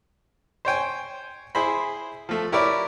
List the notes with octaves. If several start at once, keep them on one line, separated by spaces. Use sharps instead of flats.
C5 C#5 G5 G#5
E4 G#4 C5 B5
F3 A3
E4 G4 A#4 B4 C#5 D5